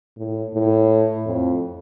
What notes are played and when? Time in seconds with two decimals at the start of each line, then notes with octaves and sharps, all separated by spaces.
0.17 A2
0.54 A2
1.26 F2